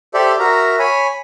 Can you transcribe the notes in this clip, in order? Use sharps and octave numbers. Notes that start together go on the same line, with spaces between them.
G4 A4 C5 D5 E5
F#4 A#4 E5 A#5
C#5 G#5 B5